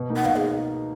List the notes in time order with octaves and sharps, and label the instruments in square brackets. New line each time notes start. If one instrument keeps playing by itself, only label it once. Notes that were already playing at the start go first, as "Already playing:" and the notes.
Already playing: [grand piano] B2
A#3 D#4
[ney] F#5
[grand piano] B2 [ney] F5
[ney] G#4